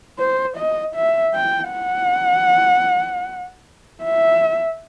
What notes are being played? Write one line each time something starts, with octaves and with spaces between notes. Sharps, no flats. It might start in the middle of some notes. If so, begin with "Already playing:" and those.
C5
D#5
E5
G5
F#5
E5